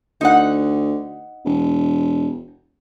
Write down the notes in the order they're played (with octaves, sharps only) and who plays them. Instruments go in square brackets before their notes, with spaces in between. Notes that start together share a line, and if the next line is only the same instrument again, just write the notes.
[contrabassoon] D2 [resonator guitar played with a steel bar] D#4 F#5
[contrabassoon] E1